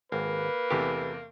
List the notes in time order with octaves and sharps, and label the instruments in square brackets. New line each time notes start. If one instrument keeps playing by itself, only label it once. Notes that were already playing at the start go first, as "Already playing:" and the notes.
[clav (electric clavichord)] G#1 [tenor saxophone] A#3 [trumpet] B4
[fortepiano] E2 C3 A3 [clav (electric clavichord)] G4